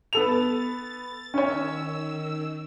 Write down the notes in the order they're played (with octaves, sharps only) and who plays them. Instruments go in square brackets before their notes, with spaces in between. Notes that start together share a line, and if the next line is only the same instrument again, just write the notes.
[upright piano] B3 A4 F7 [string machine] A6
[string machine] D#3 E6 [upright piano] C#4 C#5